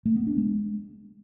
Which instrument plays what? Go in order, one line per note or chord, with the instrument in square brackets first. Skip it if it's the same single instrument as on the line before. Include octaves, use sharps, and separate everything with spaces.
[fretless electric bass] A3
B3
D4
G#3